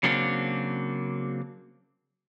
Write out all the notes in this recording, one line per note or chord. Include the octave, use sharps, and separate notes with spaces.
C#3 F#3 A#3 C4 D4